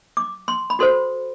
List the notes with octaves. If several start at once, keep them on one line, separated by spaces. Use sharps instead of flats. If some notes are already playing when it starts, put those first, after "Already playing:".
D6
C6
B5
F#4 A4 C5 C6